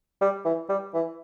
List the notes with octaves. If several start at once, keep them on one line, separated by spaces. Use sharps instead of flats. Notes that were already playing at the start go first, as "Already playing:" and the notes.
G3
E3
G3
E3